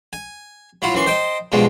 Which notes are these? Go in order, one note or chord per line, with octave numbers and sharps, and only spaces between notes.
G#5
F#3 E4 F4
F#2 E3 C6 C#6
C5 D#5 G5 A5
G2 B2 F3 G#3